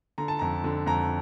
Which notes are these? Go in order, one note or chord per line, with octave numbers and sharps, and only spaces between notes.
D3 A#5
A5
F2 A#5
D3
F2 A#5